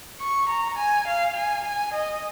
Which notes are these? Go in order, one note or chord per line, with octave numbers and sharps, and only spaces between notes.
C#6
A#5
G#5
F5
G#5
G#5
D#5